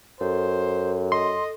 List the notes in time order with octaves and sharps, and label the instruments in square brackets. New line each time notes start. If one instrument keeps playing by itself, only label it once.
[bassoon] F#2 [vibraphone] A4 [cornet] C5
[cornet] D#5 [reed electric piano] C6